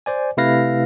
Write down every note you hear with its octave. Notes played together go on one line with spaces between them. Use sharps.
C5 D5 G#5
C3 A3 E4 B4 F5 A#6